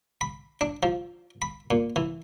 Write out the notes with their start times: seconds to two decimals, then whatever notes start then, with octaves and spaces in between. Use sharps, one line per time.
0.21 B5
0.61 D4
0.83 F3
1.42 B5
1.71 A#2
1.96 E3